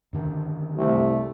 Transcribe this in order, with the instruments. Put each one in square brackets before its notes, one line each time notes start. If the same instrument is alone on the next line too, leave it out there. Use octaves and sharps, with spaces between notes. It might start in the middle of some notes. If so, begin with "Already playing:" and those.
[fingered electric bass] F#2 D3 D#3
[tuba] C2 [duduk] A3